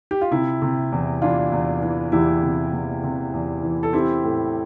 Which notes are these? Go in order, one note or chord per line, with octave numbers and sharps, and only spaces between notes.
G4
F4
C3 E4
C3
E2
E3 D4 F4
E2
E3
E2 E4 G4
C3
E2
C3
E2
E3
A4
C4 E4 G4
A2